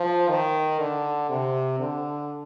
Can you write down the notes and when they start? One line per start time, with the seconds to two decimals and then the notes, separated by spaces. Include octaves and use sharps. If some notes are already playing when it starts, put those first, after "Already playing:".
Already playing: F3
0.29 D#3
0.80 D3
1.29 C3
1.79 D3